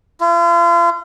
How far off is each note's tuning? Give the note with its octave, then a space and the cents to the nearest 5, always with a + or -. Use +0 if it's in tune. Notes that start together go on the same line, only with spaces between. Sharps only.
F4 -40